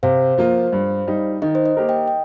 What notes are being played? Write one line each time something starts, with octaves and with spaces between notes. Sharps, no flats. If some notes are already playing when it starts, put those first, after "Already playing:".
C3 C5 F5
F3 A#3 F4
G2
G3 D#4
D#3 D#5
C5
D#5
A#3 G4 A#4
D#5 G5
G5